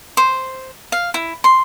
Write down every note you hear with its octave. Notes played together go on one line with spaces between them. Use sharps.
C5
F5
E4
C6